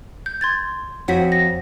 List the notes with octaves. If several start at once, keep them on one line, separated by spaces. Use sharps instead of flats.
G6
C6 G#6 A6
F2 C4 F#4 C#5 B6
A#6